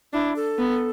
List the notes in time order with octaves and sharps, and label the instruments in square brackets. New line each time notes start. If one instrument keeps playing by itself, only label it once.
[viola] D4 [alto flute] E4
[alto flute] A4
[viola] B3